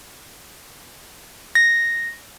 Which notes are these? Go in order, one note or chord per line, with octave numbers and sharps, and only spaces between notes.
A#6